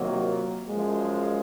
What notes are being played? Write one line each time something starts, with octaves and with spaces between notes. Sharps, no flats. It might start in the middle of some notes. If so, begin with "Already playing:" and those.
Already playing: C3 D#3 F#3 A#3 F4
F#2 F3 G#3